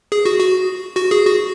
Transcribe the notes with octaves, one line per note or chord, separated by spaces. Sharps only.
G#4
F#4
F#4
F#4
G#4
F#4